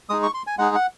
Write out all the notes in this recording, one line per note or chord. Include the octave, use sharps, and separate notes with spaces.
G#3 D#4 G#4 D#6
C#6
C6
G#5
G#3 D#4 G#4 F#5
F#5